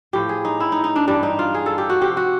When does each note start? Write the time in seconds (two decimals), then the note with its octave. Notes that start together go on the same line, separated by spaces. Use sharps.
0.13 A2 F3 G4
0.29 G#4
0.45 D#4
0.60 E4
0.72 D#4
0.84 D#4
0.96 D4
1.07 G2 E3 G3 D4
1.23 D#4
1.39 F4
1.54 G#4
1.66 A4
1.78 G4
1.90 F#4
2.01 C3 F3 G4
2.17 F#4